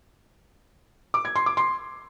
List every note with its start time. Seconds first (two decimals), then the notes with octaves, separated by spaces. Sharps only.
1.14 D6
1.25 G#6
1.36 C6
1.46 D6
1.57 C6